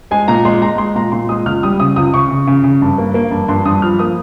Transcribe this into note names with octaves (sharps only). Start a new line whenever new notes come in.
G#3 G#5
A#2 A#5
G#3 C6
G#3 A#5
G#3 C6
A#2 A#5
A#2 C6
G#3 D#6
C#2 F6
G3 D#6
C#3 D#6
C#2 D#6
C#3 C#6
C#3
C#3
C#3
G2
A#3
A#3
G2
G2 C6
G2 D#6
F3 F6
A#3 D#6